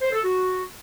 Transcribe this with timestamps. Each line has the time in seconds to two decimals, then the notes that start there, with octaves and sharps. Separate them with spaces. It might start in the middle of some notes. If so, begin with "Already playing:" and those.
0.01 C5
0.12 A4
0.24 F#4